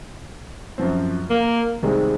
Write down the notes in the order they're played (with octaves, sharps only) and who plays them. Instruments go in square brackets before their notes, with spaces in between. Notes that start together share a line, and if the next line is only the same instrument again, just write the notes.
[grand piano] F#2 F3 C4
[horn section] A#3
[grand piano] C2 C3 D#3 G#3 C4